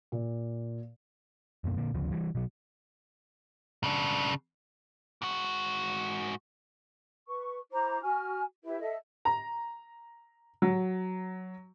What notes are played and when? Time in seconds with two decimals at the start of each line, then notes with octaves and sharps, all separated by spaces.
0.12 A#2
1.64 A1 F#2 B2 A#3
1.76 A#2 D3 A#3
1.94 D2 C#3 F3
2.11 E3 G3
2.35 B2 F#3
3.84 C#3 D4
5.22 G#2 F#4
7.27 B4 C#6
7.71 E4 C5 A#5 D6
8.02 F#4 G#5 F6
8.63 E4 G4 B4 E5
8.79 A4 D#5 E5
9.25 A#5
10.62 F#3